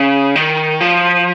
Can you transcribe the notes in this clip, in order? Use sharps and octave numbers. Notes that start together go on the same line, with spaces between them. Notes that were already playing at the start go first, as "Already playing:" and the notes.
Already playing: C#3
D#3
F3